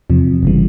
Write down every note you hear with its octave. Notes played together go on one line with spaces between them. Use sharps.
E2 C3 F3
G1 C#3 E3 G3